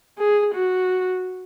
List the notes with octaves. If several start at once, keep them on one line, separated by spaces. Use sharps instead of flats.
G#4
F#4